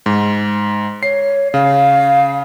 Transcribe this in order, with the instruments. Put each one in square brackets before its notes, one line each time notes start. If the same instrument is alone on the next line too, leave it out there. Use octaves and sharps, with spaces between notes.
[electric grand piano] G#2
[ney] C#5 [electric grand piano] C7
[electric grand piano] C#3 [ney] F5